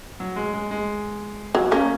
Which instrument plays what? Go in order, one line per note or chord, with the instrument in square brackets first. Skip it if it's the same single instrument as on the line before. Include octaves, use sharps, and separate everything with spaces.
[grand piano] F#3
G#3
G#3
G#3
[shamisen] F#3 [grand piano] A#3
[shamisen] A#3 [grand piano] C#4